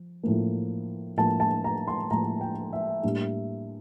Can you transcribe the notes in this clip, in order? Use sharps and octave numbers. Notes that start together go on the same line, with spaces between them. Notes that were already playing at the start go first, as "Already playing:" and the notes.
Already playing: F3
A2 F3 A#3
A2 F3 A#3 A5
A5
A#5
C6
A2 F3 A#3 A#5
G5
E5
A2 G3 A#3 D4